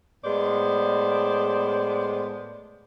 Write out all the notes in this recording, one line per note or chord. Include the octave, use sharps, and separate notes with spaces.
A2 G#3 B3 C5 D5